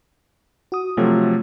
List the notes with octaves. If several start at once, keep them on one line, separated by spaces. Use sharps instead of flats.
F#4 D#6
C3 F3 F#3 A3